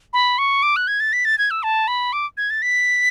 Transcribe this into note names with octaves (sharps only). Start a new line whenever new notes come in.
B5
C#6
D6
F#6
G#6
A6
B6
A6
G#6
E6
A5
B5
D6
G#6
A6
B6